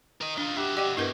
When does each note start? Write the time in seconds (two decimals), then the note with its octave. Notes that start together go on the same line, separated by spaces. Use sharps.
0.21 A#4 D#5
0.38 D4 F4 D#5
0.57 D4 F#4 G4 E5
0.77 G4 D5 D#5 G5
0.97 G2 B2 E4 A#4 B4